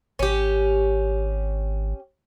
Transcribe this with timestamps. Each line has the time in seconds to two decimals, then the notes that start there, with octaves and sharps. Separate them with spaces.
0.19 G#1 C#4 G4